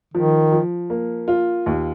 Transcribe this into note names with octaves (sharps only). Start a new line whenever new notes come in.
D#3 F3
F3
A#3
F4
D#2